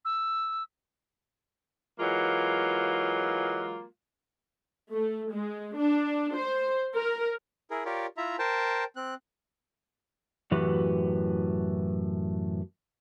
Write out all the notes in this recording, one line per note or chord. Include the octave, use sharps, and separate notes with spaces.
E6
E3 F#3 G#3 A#3 F4
A3
G#3
D4
C5
A#4
E4 G#4 A#4
F4 G4 A#4 C#5 D5
E4 F4 E5 A#5
A#4 C5 G5 A5
C4 F#6
F#2 A2 E3 F#4 G4 B4